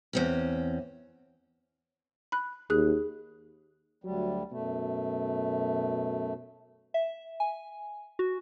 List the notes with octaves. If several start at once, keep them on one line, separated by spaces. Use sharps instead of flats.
E2 C4 C#4
B5 F#6
D#2 G#4 F#6
D2 F#3 G3
F#2 B2 A3
E5
G#5
F#4